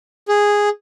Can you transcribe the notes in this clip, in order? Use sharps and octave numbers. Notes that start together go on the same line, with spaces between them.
G#4